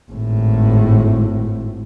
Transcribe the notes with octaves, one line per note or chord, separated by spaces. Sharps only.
G#1 A2